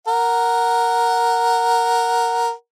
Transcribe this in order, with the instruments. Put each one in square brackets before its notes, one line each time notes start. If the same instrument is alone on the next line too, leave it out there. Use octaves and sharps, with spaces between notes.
[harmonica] A#4 F#5